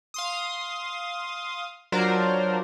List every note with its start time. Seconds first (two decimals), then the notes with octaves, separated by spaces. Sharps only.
0.14 F5 C6 D#6
1.92 F#3 D4 F4 A#4 C5 D5